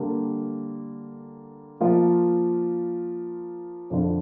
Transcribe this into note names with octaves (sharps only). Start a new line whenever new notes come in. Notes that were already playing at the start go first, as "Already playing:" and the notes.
Already playing: D3 G3 A#3
F3 A#3 F4
F2 D3 F3 D4 F4